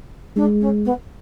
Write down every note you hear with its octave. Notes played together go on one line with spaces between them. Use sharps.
G#3 D4
C#4
B3